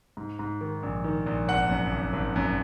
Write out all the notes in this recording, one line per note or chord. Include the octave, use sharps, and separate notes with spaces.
G#2
G#2
D#3
A#1
D#3
A#1
G#1 F#5
F#2
G#1
G#1
F#2